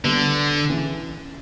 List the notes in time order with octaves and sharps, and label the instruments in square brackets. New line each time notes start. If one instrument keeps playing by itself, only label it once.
[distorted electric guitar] D3 [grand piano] G3 B3
[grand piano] C#3 E3